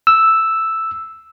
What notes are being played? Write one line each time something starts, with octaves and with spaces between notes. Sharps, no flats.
E6